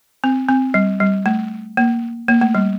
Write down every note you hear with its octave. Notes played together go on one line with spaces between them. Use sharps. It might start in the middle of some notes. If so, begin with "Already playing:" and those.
C4
C4
G3
G3
A3
A#3
A#3
A3
G3